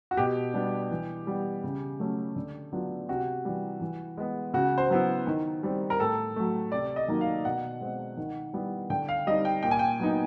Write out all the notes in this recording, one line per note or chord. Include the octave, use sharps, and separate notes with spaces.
F#4
B2 G4
G3 B3 D4
E3
G3 B3
C#3
F#3 A3 C#4
D3
F#3 B3 D4 F4
C3 F#4
E3 G3
E3
G#3 B3
C#3 F#4
C5
F#3 B3 E4
D#3
G3 C4
A#4
A2 A4
F#3 A3
C3 D5
D#5
D#3 F#3 A#3 D#4
F5
B2 F#5
G#3 C4
D#3
G3 B3 E4
D3 G5
F5
G3 C4 D#4 D#5
G5
A#2 G5
G#5
G5
F#3 B3 D#4